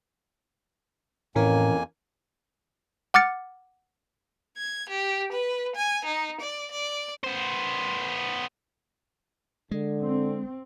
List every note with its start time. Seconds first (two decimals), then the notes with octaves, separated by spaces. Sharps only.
1.36 F2 A2 E3 A#3 C#4 A#4 G#5
3.14 F#5 D6 F6 A6 C#7
4.58 G#6
4.89 G4
5.32 B4
5.76 G#5
6.05 D#4
6.41 D5
6.71 D5
7.24 B3 C5
9.71 D3 G#3
10.03 C4